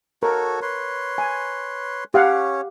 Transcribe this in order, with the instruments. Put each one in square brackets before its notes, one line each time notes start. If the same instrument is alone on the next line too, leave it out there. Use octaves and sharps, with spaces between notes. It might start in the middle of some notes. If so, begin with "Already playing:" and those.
[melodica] F#4 A4 C#5 [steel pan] A#4
[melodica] B4 C#5 C6
[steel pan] G#5
[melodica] C#4 C#5 [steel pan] G4 F5 F#5